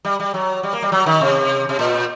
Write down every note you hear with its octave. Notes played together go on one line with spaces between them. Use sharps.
G3
G3
F#3
G3
A#3
G3
F#3
D#3
C3
C3
A#2